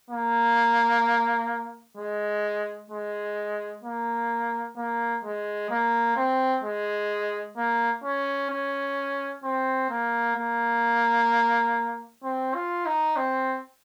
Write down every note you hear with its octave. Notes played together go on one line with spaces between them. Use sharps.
A#3
G#3
G#3
A#3
A#3
G#3
A#3
C4
G#3
A#3
C#4
C#4
C4
A#3
A#3
C4
F4
D#4
C4